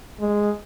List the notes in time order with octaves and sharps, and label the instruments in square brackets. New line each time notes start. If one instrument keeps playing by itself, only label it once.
[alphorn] G#3